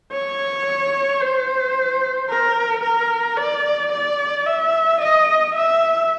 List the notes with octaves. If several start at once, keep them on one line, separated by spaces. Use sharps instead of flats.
C#5
C5
A#4
A#4
D5
D5
E5
D#5
E5